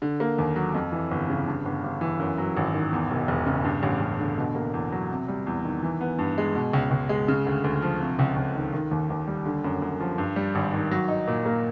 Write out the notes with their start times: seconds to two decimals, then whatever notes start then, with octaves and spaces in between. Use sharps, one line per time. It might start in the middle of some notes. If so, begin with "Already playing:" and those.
0.02 D3
0.20 A#3
0.38 D#2
0.56 F#3
0.74 F2
0.92 E3
1.11 G1
1.30 C#3
1.47 G2
1.65 G1
1.84 G1
2.01 E3
2.20 F#2
2.38 F#3
2.57 G#1
2.74 D#3
2.93 E2
3.11 E1
3.28 E1
3.46 C#3
3.64 G2
3.83 A1
4.01 A1
4.19 D3
4.37 B2
4.55 A#3
4.74 E2
4.92 F#3
5.10 C3
5.28 G3
5.47 E2
5.64 D#3
5.83 E3
6.01 B3
6.19 G2
6.38 G#3
6.55 B2
6.73 C#2
6.91 C#2
7.09 G#3
7.28 C#3
7.46 D2
7.64 D2
7.82 F3
8.00 C3
8.19 C#2
8.36 C#2
8.55 D#3
8.73 D#3
8.91 D#2
9.10 D#2
9.27 G3
9.46 D3
9.64 F#2
9.82 F#2
10.00 F3
10.18 G2
10.36 G3
10.55 G#1
10.73 D#3
10.91 F#3
11.08 D#4
11.27 A#2
11.46 A#3